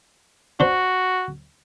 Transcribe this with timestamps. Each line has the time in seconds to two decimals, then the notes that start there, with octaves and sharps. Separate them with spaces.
0.60 D4 F#4 C5